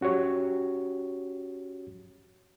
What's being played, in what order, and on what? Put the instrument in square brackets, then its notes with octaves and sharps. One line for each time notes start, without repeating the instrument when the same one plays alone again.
[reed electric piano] C#4 F#4 G4 C#5